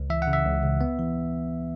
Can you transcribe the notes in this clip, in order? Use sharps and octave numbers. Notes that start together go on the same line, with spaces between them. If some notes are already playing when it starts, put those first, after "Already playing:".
Already playing: C#2
E3 E5
F#5
C#3
E5
C#2
C#2
B3
E3